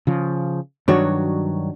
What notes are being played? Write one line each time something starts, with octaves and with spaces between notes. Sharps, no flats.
C#3 F3
G2 D#3 F#3 D4 F#4 C#5